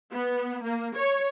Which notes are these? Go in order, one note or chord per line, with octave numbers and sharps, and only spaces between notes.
B3
A#3
C#5